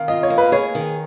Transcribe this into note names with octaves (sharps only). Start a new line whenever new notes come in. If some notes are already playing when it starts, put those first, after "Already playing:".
Already playing: D#3 F5
F4 D#5
C#5
A#3
B4
G#4 C#5
D#3